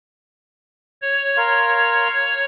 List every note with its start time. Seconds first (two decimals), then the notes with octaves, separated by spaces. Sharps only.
1.02 C#5
1.37 A#4 F5 C6